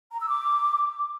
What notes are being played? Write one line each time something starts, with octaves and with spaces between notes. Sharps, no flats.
A#5
E6
D6